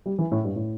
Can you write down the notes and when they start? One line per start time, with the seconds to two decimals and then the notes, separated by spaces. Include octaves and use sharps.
0.06 G3
0.19 E3
0.32 A2
0.44 G2
0.56 A2